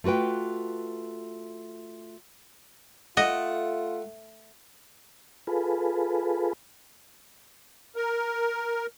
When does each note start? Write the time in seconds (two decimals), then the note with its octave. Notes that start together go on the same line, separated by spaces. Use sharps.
0.04 A3 F4 F#4 B4 G5
3.17 A3 F4 D#5 F#5
5.47 F4 G#4 A4 B4
7.96 A#4